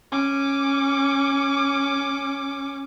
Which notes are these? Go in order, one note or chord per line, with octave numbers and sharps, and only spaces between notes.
C#4 D6